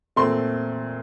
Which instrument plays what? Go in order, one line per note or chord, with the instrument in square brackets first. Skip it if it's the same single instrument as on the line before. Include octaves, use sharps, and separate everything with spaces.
[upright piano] A#2 A3 C4 C6